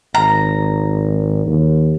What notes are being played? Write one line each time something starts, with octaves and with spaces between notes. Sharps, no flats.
G#1 A#5
D#2